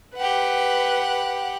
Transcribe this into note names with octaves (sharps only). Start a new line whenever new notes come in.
G4 B4 F#5